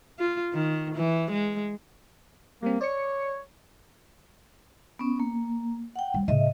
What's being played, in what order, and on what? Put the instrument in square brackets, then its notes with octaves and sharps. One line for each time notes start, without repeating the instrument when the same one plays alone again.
[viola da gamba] F4
D#3
E3
G#3
[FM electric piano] G3 C4 [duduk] A#3
[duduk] C#5 [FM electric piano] D5 C#7
[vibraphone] B3 C#4
A#3
F#5 G5
[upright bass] G3 F4
[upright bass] A2 C#3 [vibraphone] D#5 E5